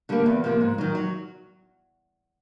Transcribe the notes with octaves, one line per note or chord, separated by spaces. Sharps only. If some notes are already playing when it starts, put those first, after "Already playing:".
D3 G3 A#3
E2
C3 F3 A#3
G#2
D#3 F#3
F#3